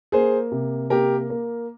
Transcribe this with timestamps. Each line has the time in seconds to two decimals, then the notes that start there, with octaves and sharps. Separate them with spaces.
0.12 A#3 G#4 C5
0.52 C3
0.90 A#3 G4 A#4
1.30 A#3